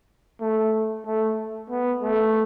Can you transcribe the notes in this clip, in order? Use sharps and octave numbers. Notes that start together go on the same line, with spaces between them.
A3
A3
B3
A3